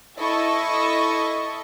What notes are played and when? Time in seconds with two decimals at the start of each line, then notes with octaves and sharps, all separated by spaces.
0.19 E4 A4 D#5 A5 C#6